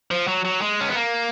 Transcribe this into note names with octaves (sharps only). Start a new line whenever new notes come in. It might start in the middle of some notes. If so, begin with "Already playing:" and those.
F3
F#3
F#3
G#3
C#4
B3
A#3